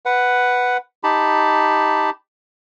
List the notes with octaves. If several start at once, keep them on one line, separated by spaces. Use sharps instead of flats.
B4 F#5
D#4 G4 A5 B5